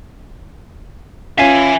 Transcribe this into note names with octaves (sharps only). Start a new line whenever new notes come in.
C#4 F4 E5 G#5 C7